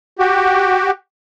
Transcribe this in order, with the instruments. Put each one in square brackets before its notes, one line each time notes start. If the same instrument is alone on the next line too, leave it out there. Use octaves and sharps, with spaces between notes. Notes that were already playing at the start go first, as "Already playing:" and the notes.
[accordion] F#4 G4